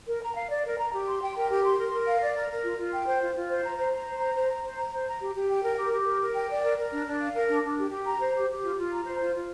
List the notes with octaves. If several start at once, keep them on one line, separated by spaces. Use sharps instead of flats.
A#4
A#5
F5
D5
A#4
A#5
G4
C6
G5
A#4
G4
C6
A#4
A#4
F5
D5
A#4
A#4
F4
F4
G5
C5
F4
F4
C5
A#5
C5
A#5
C5
A#5
C5
A#5
C5
A#5
C5
A#5
G4
G4
G5
A#4
G4
G4
A#4
A#4
G5
D5
A#4
A#4
D4
D4
F5
A#4
D4
D4
G4
G4
A#5
C5
G4
G4
F4
F4
A#5
C5
F4
F4